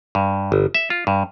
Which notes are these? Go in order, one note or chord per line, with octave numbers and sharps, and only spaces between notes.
G2
G1
E5
F4
G2